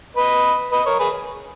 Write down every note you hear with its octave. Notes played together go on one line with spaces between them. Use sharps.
B4 D#5
B4 D#5
A#4 C#5
G#4 B4